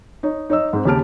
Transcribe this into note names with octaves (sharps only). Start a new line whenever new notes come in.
D#4 C#5
D#4 C#5 D#5 E6
G#2 C4
D#2 C#3 G4 A5 F6 D7